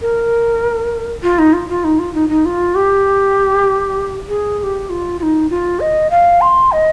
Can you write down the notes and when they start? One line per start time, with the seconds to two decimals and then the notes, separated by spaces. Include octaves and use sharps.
0.01 A#4
1.23 F4
1.39 D#4
1.53 F4
1.69 F4
1.84 D#4
1.99 F4
2.14 D#4
2.29 D#4
2.45 F4
2.75 G4
4.28 G#4
4.59 G#4
4.63 G4
4.89 F4
5.19 F4
5.23 D#4
5.50 F4
5.80 D#5
6.10 F5
6.41 C6
6.72 D#5